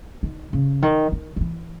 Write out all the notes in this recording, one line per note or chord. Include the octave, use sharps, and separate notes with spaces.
D#3
C#3
D#3
D#3
D#3
E3